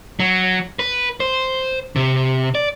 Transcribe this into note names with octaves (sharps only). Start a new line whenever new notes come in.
F#3
B4
C5
C3
D5